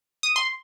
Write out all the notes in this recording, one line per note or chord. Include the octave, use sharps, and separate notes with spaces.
D#6
C6